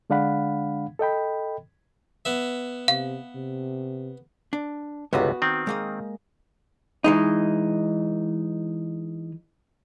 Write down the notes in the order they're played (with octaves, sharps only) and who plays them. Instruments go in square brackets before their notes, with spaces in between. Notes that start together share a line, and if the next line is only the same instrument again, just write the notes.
[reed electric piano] D3 G#3 D4 F5 F#5 B5
A4 D#5 G5 B5
[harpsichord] B3 E5
[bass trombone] C3 [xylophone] F5
[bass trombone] C3
[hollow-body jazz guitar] D4
[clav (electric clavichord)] G1 C#2 C3 [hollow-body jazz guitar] B3 F#4 B4
[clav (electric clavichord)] D#3 C4
[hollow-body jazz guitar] G#3 A#3 D#5
E3 G#3 D#4